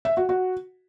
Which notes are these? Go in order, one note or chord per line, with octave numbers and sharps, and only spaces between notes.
E5
F#4
F#4